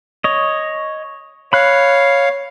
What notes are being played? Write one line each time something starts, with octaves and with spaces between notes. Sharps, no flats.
C#5 D#5
C#5 F5 B5 F#6